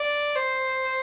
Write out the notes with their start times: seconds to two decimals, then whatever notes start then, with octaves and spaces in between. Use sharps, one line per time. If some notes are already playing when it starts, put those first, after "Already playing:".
Already playing: D5
0.36 C5